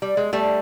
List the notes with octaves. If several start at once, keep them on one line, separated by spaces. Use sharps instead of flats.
G3
G#3
G3 A3